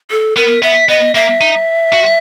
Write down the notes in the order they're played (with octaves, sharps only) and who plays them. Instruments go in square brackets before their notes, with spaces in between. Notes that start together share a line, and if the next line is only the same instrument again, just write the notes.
[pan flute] A4
[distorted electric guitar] B3 [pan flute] A#4
[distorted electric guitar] B3 [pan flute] E5
[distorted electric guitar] B3 [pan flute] D#5
[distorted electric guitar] A#3 [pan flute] E5
[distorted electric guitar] D#4
F#4